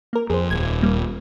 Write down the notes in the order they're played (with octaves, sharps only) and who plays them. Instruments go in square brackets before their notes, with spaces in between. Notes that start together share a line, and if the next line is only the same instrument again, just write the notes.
[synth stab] A#3 A#4
[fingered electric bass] F2 [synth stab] G#4 C5
[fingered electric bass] D#1 [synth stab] G#6
[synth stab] G3 A#3